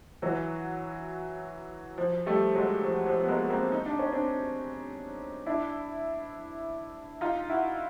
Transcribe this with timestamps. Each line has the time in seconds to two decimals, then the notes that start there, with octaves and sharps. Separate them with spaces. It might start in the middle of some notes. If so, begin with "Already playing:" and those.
0.22 E3 F#3
1.98 F3
2.26 G3 A3
2.55 F#3 G#3
2.85 F3
3.06 F3
3.21 B3
3.28 G#3 A#3
3.50 A#3 C4
3.72 D#4
3.86 D4
3.99 C#4
4.12 C4 D4
5.46 D4 E4
7.21 D#4 F4
7.50 E4 F#4